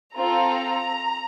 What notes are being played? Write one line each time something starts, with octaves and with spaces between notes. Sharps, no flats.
C4 F4 A4 A#5